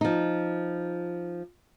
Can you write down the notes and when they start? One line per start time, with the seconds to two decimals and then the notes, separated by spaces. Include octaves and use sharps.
0.01 F3 D#4